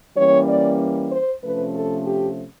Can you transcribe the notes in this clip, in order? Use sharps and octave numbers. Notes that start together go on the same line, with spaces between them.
E3 G3 A#3 C#4 C#5
D5
C5
C3 F3 A3 C#4 B4
A4
G4